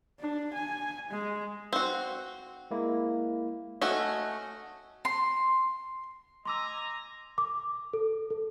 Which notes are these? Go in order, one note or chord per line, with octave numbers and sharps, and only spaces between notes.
D4
G#5
G#3
C4 F#4
G#3 A#3 E4
A3 C#4 F#4 D#5
C6
D#5 G#5 A#5 C6 D6 E6
D6
A4
A4